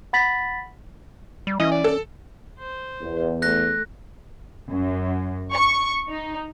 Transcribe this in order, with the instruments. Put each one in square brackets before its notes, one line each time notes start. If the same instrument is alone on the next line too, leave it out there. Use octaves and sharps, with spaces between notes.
[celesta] F#5 B5 A6 B6 F#7
[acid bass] G3
[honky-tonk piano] E3 [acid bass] C#4 [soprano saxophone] D#5
[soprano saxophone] D5
[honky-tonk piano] A4
[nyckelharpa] C5
[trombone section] E2
[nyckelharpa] A3 [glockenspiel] F#6 A#6
[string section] F#2
C#6
D#4